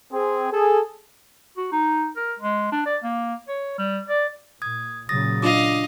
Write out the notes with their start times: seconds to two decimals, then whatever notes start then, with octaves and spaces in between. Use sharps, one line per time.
0.12 C4 G#4
0.51 G#4 A4
1.57 F#4
1.72 D#4
2.16 A#4
2.40 G#3
2.72 D4
2.86 D5
3.03 A#3
3.48 C#5
3.78 G3
4.09 D5
4.62 A#2 D#6 G#6
5.09 A#2 C#3 F#3 D#6 A6 A#6
5.42 D4 F4 D#5 F5 D6